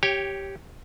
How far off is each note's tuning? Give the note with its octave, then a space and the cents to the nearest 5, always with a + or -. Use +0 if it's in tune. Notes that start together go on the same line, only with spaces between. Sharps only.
G4 -5 C#5 +0 G5 +20